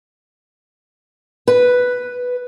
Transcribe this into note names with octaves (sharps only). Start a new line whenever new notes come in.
B4